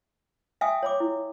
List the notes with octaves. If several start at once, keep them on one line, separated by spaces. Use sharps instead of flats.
E5 F5 G5 G#5 D#6
C#5 C6 D6
E4